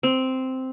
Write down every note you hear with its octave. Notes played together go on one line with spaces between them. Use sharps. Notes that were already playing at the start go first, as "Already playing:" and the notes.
C4